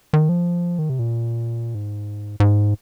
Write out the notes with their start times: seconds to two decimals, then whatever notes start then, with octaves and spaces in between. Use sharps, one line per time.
0.13 D#3
0.29 F3
0.79 D#3
0.90 C3
0.99 A#2
1.75 G#2
2.40 G#2